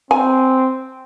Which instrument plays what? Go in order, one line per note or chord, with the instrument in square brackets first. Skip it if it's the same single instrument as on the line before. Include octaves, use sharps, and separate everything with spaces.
[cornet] C4 [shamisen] G#5